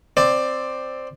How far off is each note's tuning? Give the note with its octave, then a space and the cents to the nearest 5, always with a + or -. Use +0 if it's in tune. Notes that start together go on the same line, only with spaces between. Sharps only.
C4 +0 D5 +10